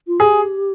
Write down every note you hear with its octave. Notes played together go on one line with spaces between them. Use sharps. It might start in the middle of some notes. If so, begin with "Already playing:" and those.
F4
G4 G#4